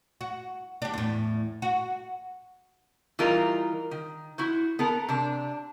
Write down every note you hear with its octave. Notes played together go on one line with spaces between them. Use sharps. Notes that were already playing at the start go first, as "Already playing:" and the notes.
F#4
D4 G4
E2 A2
F#4
E3 G3 D#4 F4 A#4
D#3
E4 F#4 C5
B3 A4 A#4
C3 D4